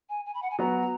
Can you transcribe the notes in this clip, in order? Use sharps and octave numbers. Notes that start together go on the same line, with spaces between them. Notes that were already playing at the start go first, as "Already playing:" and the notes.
G#5
G#5
B5
F#5
G#5
F#3 B3 F#4 A#5